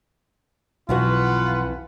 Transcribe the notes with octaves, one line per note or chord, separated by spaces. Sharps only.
B1 F2 E3 F4 F#4 B4 F#5